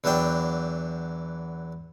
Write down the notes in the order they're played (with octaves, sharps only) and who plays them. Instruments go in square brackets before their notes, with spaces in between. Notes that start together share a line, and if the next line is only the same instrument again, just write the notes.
[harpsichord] E2 E3 F#3 D4 G5